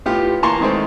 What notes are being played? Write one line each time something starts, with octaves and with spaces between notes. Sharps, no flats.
A2 B3 F4 G4
E3 A#3 A5 A#5 C6 C#6
D#3 G#3 A3 C4